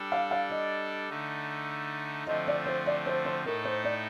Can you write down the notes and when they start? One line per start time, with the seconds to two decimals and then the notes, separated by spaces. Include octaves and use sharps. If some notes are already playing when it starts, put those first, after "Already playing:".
Already playing: G3 D4 A4
0.12 F5
0.31 F5
0.50 D#5
1.09 D3 A3 D#4
2.27 D3 F3 A3 C4 F4 D#5
2.47 D5
2.66 C5
2.86 D5
3.06 C5
3.25 C5
3.45 A2 A3 D#4 A4 A#4
3.65 C5
3.84 D5